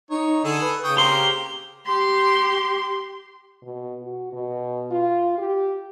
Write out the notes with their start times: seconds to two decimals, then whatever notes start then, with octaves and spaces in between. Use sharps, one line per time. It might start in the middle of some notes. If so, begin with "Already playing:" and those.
0.11 D#4 C#5
0.44 D3 G#4 A4
0.62 B4
0.84 C#3 G5 C#6 D#6
0.97 A#3 C4 G4 A#4 C6
1.86 G4 C6
3.62 B2
4.02 F#4
4.32 B2
4.91 F4
5.38 G4